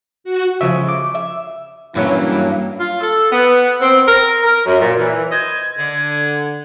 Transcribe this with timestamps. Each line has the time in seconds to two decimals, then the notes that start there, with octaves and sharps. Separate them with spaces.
0.24 F#4
0.61 C#3 F3 G#3 E5
0.89 D6
1.15 E5
1.95 G2 E3 F#3 A#3 C#4 E4
2.79 F4
3.00 A4
3.31 B3
3.80 C4
4.06 A#4
4.43 A#4
4.66 F#2
4.81 A#2
4.98 E3
5.32 C5 D#5 G#6
5.78 D3